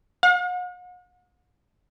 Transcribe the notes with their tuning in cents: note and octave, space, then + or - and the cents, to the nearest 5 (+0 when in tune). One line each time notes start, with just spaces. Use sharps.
F#5 -45